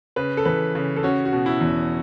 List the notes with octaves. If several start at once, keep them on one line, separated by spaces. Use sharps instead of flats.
C#3 B4
A4
E3 B4
C#3
A4
C#4 F#4
F#4
B2
E4
E2